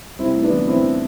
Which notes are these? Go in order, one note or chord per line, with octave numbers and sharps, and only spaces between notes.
C2 C4 E4
A3
B3 D4
E3
E3 C4 E4